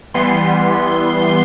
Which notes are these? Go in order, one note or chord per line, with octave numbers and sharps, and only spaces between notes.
E3 G3 B3 C6